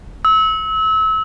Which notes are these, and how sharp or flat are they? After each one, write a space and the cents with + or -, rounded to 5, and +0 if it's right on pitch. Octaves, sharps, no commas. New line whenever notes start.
E6 -30